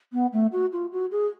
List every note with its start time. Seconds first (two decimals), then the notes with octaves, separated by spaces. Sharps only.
0.13 B3
0.33 A3
0.52 F#4
0.72 F4
0.92 F#4
1.12 G#4